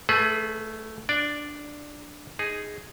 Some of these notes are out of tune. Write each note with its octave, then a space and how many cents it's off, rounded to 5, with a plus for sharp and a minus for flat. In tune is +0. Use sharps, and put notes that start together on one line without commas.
A3 +0 G#4 +35 B4 +0
D4 +0 D5 +0
D#4 +0 G#4 +0